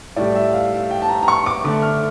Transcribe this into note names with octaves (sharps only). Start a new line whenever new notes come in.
A2 G3 D5
E5
F5
G5
A5
A#5
A#5
C#6
D6
D3 A3 D6
F6